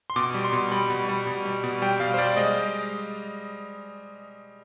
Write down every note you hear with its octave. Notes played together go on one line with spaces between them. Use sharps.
C6
B2 D6
G3
C6
B2
G3 B5
B2
G3
B2
G3
B2
G3 G5
B2 F5
C5
G3 D5
G#3 D#5